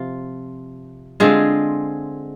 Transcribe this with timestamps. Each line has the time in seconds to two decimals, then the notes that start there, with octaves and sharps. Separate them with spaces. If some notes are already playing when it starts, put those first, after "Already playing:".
Already playing: C3 F3 C4 F4
1.20 D3 G#3 C4 F4 G#4